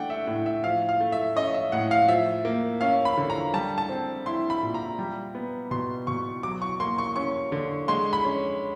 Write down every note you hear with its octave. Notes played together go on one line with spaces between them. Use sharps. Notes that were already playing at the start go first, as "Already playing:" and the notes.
Already playing: A3 D4 F#5 G5
E5
A2
E5
F3 F5
F5
A3
E5
C#4 D#5
E5
A2 F#5
F5
F3 E5
A#3
C#4 F5
B5
D3
A#5
G3 A5
A5
C4
E4 C6
B5
A#2
A#5
G3
B3
B2 C6
B2 C#6
F#3 D6
C#6
A#3 C6
C#6
C#4 C#6
D3
G#3 C6
B5
C#4